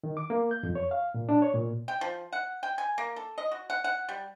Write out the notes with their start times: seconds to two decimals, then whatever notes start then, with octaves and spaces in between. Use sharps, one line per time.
0.03 D#3
0.17 D6
0.30 A#3
0.51 G6
0.63 F2
0.75 C#5
0.91 F5
1.14 A#2
1.29 D4
1.42 C#5
1.54 A#2
1.88 G5
2.01 F3
2.33 F#5
2.63 G5
2.78 G#5
2.98 A#3
3.16 A4
3.38 D#5
3.51 F#4
3.70 F#5
3.84 F#5
4.09 G3